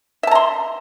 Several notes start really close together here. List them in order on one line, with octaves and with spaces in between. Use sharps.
E5 A5 A#5 C6